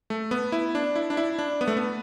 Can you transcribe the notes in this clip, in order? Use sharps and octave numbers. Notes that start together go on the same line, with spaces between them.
A3
B3
E4
D4
E4
D4
E4
D4
B3
A3
B3